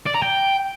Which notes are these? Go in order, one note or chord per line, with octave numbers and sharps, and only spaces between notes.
D5
A#5
G5